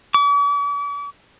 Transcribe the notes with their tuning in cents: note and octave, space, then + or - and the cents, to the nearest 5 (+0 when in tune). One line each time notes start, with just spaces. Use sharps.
D6 -45